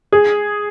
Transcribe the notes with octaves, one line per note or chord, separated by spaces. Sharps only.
G#4